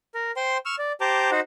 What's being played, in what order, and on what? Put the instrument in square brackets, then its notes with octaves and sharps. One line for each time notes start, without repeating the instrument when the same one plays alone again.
[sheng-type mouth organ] A#4
C5 G5 C6
C#6 E6 F6
D5
G4 C5 A5 A#5 D6 G6
D#4 F#4 C5 F#5